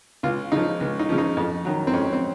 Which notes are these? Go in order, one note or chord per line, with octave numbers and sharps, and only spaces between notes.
C#2 F4
C#3 F3 D#4
C#2
D#4
C#3 F3
D#4
F2
D#3 F#3
C4
F2 C#4
C4